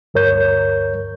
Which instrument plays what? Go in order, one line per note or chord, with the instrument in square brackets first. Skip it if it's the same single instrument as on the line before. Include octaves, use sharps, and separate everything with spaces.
[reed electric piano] D2 G2 A#4 C#5 G6